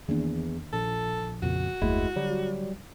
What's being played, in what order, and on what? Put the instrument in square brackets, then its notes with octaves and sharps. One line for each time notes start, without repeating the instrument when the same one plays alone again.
[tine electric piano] E2 [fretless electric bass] D#3 A#3 D4
[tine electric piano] A#1 [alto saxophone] A4
[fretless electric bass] F2 A#2 C#3 [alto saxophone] F#4
[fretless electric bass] F#1 D#2 A3 [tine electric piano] G#3 E4
[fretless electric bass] D3 [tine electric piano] F#3 G3